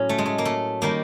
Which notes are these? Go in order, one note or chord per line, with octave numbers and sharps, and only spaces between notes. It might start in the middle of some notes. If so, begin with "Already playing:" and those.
Already playing: A2 F#3 C#4
A3
G#3
A3
A#3
A3
D#3 G3 A#3